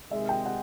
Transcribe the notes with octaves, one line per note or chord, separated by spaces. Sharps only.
C3 D#3 G#3 E5
G5
F#5